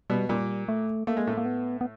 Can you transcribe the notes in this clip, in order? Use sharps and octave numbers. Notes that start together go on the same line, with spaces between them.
B2 G3 B3
A#2 G3 A#3
A3
A3 A#3
G#3
A2 A3
A#3
B3
B3